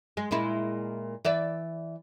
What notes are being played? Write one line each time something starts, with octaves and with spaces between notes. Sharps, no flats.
G#3
A#2 G#3 E4
E3 D5 E5